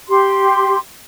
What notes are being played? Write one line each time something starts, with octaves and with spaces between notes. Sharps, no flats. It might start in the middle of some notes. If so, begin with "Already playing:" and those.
G4 C6